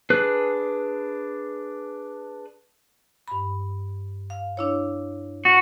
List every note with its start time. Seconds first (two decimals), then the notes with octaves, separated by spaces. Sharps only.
0.10 D4 G#4 B4 F#6
3.28 G2 B5
4.30 F5
4.57 D4 E4 C#5
5.45 F#4